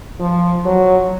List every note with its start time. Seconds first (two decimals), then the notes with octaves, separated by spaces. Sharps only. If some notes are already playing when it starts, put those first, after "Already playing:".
0.20 F3
0.65 F#3